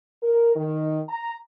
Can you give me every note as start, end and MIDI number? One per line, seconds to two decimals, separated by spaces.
0.22 0.53 70
0.56 1.01 51
1.09 1.34 82